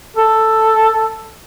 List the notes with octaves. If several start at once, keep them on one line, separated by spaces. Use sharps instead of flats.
A4